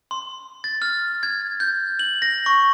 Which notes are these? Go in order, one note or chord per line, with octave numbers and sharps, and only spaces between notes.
C6
A6
F6
G#6
G6
F#7
A#6
C#6